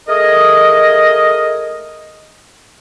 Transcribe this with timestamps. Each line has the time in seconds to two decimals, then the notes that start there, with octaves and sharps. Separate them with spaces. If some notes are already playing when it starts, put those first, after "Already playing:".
0.09 A3 G#4 A#4 D#5